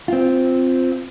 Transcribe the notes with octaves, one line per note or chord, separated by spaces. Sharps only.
C4 F4